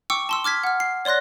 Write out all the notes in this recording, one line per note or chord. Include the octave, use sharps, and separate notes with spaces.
G5 C#6 D6 E6 C#7
A5 C6 E6
D6 F6 G#6 B6
F#5 F6
C7
C#5 D5 C6 F#6 A#6